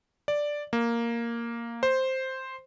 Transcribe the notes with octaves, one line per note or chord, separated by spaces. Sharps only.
D5
A#3
C5